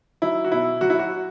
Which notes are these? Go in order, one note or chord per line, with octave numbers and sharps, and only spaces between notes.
F#3 E4
F#4
B2 E4
F#3 F#4
E4
F#4